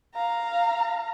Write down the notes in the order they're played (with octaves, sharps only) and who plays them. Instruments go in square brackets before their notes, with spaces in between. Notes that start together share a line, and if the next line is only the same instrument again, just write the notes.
[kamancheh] F5 A#5